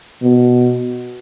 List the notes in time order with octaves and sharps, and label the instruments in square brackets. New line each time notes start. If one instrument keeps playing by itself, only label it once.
[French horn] B2